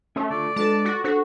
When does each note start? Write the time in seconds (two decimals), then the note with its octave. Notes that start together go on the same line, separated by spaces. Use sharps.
0.16 A3 C#4 G#4 C#5
0.30 D3 F4 D5
0.56 G#3 D4 F4 A4 B4 A5
0.85 F#4
1.04 D4 F#4 A4 C5